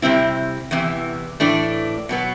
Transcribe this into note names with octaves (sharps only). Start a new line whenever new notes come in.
C3 G3 C4 E4
E2 C3 E3
A2 E3 A3 D4
B2 F#3 B3